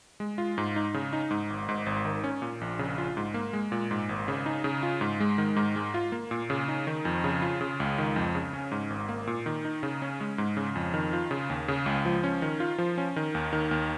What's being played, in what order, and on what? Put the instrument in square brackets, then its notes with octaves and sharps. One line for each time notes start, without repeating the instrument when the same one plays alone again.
[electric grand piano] G#3
F4
G#2
D#4
C#3
D#4
G#2
G#1
G#2
G#1
D#3
C#4
A#2
A#1
C#3
F4
G#2
A#3
G#3
A#2
G#2
G#1
C#3
D#4
C#3
F4
G#2
G#3
D#3
G#2
G#3
F4
A#3
A#2
C#3
D#4
D#3
F2
C#3
F4
C#3
C#2
D#3
F2
C#3
C#4
G#2
G#1
A#3
A#2
D#3
D#4
C#3
C#4
G#3
G#2
C#3
F2
D#3
F4
C#3
D#2
C#3
C#2
F3
C#4
D#3
F4
F3
C#4
D#3
D#2
D#3
D#2